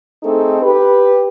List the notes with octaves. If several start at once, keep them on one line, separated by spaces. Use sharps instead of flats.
A3 C4 D#4 G#4 A4
G4 B4